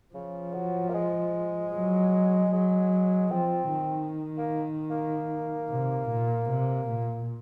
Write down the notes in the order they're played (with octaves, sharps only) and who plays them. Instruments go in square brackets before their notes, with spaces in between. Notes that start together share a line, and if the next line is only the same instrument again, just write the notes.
[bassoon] C#3 [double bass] F3
[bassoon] F#3
A#3
G#3
[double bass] F#3
[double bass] F#3 [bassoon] G#3
[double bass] F3 [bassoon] C4
[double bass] D#3
[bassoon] A#3
A#3
[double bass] C3
A#2
C3
A#2